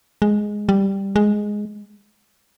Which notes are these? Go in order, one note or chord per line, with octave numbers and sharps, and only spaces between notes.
G#3
G3
G#3